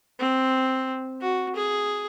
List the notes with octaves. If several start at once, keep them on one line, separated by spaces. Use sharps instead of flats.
C4
F#4
G#4